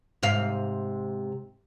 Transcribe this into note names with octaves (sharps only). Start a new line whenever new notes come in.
G#2 C3 F5